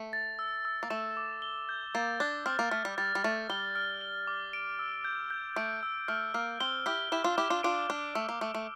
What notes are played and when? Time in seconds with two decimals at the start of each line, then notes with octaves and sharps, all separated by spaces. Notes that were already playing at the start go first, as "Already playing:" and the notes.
Already playing: A3
0.13 A6
0.39 E6
0.65 E6
0.83 A#3
0.90 A3 E7
1.17 D6
1.42 G7
1.69 G6
1.95 A#3 A6
2.20 D4 A6
2.46 C4 F6
2.59 A#3
2.71 A3 F6
2.85 G3
2.98 G3 A6
3.15 G3
3.24 A3 A6
3.50 G3 G7
3.75 F6
4.01 G7
4.27 D6
4.53 D7
4.79 E6
5.05 G6
5.30 G6
5.56 A3 D7
5.83 E6
6.08 A3 F6
6.34 A#3 F6
6.60 C4 G7
6.86 E4 G4 F6
7.12 E4 G4 E7
7.24 D4 F4
7.38 E4 G4 D6
7.50 D4 F4
7.63 D4 F4 D7
7.90 D4 D6
8.15 A3 E6
8.29 A#3
8.41 A3 E6
8.54 A3